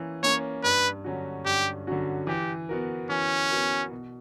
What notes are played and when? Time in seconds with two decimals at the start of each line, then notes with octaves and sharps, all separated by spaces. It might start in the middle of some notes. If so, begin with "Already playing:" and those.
Already playing: E3 A#3 C#4
0.23 A#3 C#4 C#5
0.64 G2 B4
1.04 D3 F#3 C#4 F#4
1.45 G2 G4
1.87 D3 F#3 C#4 F#4
2.27 E3 G4
2.69 B3 F#4 A#4
3.10 E3 C#4
3.50 B3 F#4 A#4
3.91 B2